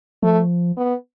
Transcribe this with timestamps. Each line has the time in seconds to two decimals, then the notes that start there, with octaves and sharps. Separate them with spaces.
0.23 F3 A3
0.77 B3